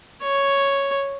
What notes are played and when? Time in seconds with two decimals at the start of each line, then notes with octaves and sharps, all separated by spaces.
0.23 C#5